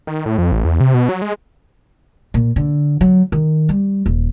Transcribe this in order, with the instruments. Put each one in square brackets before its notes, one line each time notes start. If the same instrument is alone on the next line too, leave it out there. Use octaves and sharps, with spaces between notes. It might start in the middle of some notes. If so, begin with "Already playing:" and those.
[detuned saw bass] D#3
A2
F2
A1
E2
C3
B2
F#3
G#3
[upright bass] A#2
D3
F#3
D#3
G3
D#1